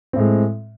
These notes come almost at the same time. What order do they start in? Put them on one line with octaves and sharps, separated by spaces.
C4 A2 G#3